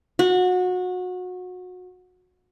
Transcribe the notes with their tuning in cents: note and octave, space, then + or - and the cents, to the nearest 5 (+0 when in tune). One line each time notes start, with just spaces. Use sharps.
F#4 -25